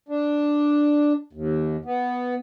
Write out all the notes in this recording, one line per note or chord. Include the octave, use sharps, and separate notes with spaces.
D4
D#2
B3